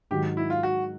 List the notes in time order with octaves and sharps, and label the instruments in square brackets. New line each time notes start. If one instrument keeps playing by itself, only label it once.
[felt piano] G#2 D#3 F#3 [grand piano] G4
[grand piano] E4
F4
F#4